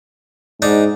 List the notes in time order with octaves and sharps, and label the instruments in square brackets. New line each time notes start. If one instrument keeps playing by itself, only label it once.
[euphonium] G#2 [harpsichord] D4 D#4